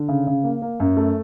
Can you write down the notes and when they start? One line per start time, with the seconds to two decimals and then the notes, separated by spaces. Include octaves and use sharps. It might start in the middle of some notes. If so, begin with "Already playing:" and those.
Already playing: D3
0.09 C#3
0.27 C#3
0.44 A#3
0.62 A#3
0.80 F#2
0.97 A3